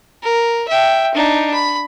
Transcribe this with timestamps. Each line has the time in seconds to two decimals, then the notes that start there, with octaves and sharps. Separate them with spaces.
0.23 A#4
0.68 E5 G5
1.15 D4 D#4
1.53 B5